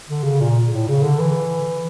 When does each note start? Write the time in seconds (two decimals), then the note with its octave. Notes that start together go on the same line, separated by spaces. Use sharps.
0.09 D3
0.24 C#3
0.41 A#2
0.72 A2
0.88 C#3
1.03 D3
1.19 E3